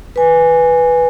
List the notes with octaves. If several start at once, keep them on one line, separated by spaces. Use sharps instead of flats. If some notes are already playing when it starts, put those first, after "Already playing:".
B4 G#5